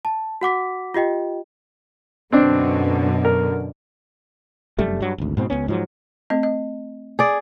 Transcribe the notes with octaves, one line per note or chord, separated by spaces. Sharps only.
A5
F#4 F#5 D6 B6
F4 G4 D#5 G5
F#2 B2 D3 C4 D4
A#4
F1 F#2 G3 A3
G2 F#3
G#1 D2
G#2 B2 C4
C#2 A2 B3 C#4
G#2 F3 F#3
A3 C4 D#5
D#5
G#4 D5